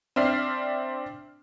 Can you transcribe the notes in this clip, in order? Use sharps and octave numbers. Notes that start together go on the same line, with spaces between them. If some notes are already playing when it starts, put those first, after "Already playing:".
C4 D4 E5 F6 C7